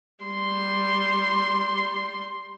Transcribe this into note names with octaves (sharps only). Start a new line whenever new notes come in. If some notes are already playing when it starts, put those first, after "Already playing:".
G3 C6